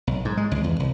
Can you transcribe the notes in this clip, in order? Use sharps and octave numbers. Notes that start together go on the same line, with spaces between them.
B1
G#2
G#3
C#2
E2
C2